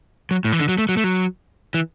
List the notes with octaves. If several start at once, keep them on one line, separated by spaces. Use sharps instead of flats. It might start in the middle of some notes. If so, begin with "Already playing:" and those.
F#3
A2
E3
D3
F#3
A3
F#3
A3
F#3
E3